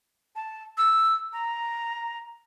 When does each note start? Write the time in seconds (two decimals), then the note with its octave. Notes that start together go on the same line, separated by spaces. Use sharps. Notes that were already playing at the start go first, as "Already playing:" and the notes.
0.36 A5
0.78 E6
1.33 A#5